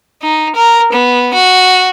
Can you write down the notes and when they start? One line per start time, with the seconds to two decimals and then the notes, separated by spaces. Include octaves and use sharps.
0.23 D#4
0.55 A#4
0.92 B3
1.34 F#4